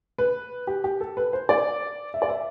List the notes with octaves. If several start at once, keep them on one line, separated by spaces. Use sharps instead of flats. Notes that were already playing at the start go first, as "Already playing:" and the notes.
B4
G4
G4
A4
B4
C5
D5
E5
D5
E5